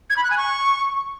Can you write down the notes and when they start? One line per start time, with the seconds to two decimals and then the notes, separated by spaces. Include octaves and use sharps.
0.10 G#6
0.17 B5
0.24 F#6
0.31 G#5
0.37 C#6